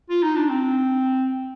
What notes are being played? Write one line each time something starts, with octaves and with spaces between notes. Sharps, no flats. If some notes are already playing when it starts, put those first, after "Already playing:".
F4
D#4
D4
C4